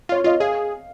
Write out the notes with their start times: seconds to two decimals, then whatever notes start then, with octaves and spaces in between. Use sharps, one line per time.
0.09 F4 C#5
0.24 F4 D#5
0.40 G#4 F5